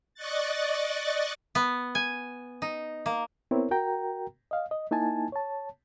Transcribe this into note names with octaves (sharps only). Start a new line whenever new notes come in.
D5 D#5 C#6 F#6 A6
B3
G#5
D#4
A#3
B3 C4 E4 A#4 C#5
F#4 A#4 G5 A#5
D#5 F5
D#5
A#3 D#4 E4 G#5 A5
C#5 A5